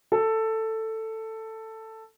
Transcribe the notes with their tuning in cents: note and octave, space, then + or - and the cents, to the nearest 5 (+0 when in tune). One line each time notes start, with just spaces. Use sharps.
A4 +10